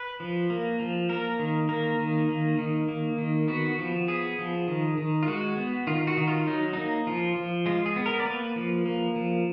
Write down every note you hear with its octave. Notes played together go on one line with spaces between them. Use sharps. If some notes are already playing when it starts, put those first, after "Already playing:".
Already playing: B4
F3
A#3
F3
A#3 A#4
D#3
A#3 A#4
D#3
A#3
D#3
A#3
D#3
B3 F#4
F3
B3 G#4
F3
D#3
D#3
F4
G#3 F#4
B3
D#3 F4
F#4
D#3
F4
F#3 D#4
A#3 D#4
F3 F4
F3
G#3 F4
G#4
B3
A#4
D5
A#3 B4
F3
A#3
F3